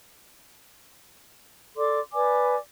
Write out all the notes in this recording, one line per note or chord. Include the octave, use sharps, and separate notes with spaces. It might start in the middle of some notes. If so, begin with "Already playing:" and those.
A4 D5 C6 D6
B4 D5 G#5 D6